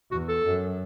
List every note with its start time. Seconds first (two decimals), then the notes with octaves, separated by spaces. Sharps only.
0.11 E2 F#4
0.28 A4
0.45 F#2